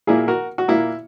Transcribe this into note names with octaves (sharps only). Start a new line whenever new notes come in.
A#2 A#3 E4 G#4
F#4 A#4
F#4
A#2 A#3 E4